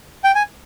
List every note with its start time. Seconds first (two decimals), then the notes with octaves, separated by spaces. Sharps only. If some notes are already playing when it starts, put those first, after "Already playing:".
0.24 G5
0.35 G#5